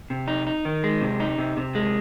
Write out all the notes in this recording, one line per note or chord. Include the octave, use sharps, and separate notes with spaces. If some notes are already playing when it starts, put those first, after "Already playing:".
C3
D#4
D#4
D#3
G#3
C3
D#4
C3
C3
G#3